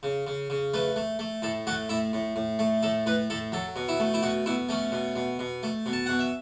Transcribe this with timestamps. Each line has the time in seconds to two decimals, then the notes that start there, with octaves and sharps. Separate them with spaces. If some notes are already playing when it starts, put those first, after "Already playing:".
0.03 C#3
0.27 C#3
0.50 C#3
0.74 A3 B4
0.96 A3
1.19 A3
1.42 A2 A4
1.67 A3 F#4
1.89 A2 E4
2.13 A2
2.36 A2
2.59 A3
2.83 A2 A4
3.06 A2 B4
3.30 A2 A4
3.52 F#3 A4
3.76 B2
3.88 E4
3.99 A3
4.14 E4
4.22 B2 F#4
4.46 B2 E4
4.69 A3 C#4
4.92 B2
5.16 B2
5.39 B2
5.63 A3
5.86 B2
5.93 A5
6.06 B2 F#5
6.19 E5